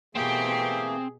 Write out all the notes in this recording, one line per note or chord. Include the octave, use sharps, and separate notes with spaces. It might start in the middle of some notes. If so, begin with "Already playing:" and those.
B2 E3 A3 A#3 C4 G4 G#4 G5